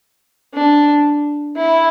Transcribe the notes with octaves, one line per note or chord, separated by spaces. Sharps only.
D4
E4